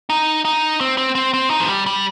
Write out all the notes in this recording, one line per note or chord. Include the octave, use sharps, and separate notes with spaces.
D#4
D#4
C4
C4
C4
C4
D#4
F3
G3
G3